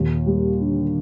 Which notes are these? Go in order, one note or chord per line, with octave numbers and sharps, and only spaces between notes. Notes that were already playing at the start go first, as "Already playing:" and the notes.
Already playing: D#2 A#2
G3
D3